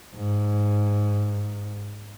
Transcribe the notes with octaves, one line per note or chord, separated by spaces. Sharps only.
G#2